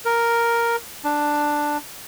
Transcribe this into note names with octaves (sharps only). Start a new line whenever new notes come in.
A#4
D4